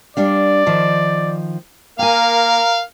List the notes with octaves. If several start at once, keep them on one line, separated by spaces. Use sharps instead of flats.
G3 D4 D5 F5
D#3 F3 A5
A#3 A#4 F5 G5 G#5